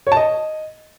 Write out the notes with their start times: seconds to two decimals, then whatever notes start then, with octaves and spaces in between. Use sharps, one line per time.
0.07 C#5
0.12 A5
0.17 D#5